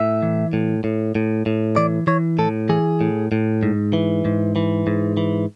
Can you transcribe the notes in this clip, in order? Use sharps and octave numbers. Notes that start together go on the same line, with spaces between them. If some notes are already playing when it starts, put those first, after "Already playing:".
Already playing: A2 E5
E3
A2
A2
A2
A2
E3 D5
E3 C#5
A2 A4
E3 G#4
A2
A2
G#2
E3
G#2
E3
G#2
E3